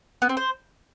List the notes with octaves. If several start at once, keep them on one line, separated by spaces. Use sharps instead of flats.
B3
C4
C5